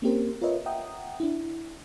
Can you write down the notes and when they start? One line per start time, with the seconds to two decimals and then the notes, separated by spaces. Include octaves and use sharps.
0.02 A#3 C4 C#4 G4 A#4 C5
0.42 F4 A#4 B4 C#5 D#5 E5
0.66 E5 F#5 G5 A#5 D#6
1.20 D4 E4